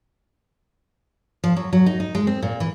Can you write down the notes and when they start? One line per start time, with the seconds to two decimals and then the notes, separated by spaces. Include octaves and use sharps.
1.44 F3
1.56 F#3
1.73 F#3
1.86 D#4
2.00 D#4
2.15 G#3
2.27 C4
2.43 A#2
2.60 E3